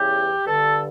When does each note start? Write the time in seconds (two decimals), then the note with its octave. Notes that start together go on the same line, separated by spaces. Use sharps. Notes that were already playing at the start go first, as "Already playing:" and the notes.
Already playing: E2 C#3 E3 G4
0.46 G2 D3 A4